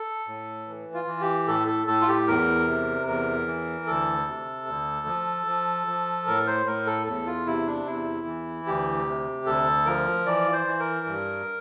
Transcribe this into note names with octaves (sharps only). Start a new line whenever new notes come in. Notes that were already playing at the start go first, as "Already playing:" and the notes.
Already playing: A4
A2
E3
F4
E3
G4
A2 A4
A4
A2 A4
F4
G4
E2 A#4
C3
E2 A#4
E3
D2 A4
C3
D2
F3
F3
F3
A2 A#4
C5
A2 A#4
A4
E2 A4
F4
C3 E4
D4
E2 E4
E3
D2 G4
C3
D2 A4
F3 A#4
E3 D5
C5
E3
A#4
G2